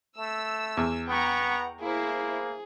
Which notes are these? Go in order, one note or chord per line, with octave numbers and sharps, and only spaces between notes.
A3 E6
E2
B3 F#5 G5 A#5 C#6
A#3 E4 G#4 C5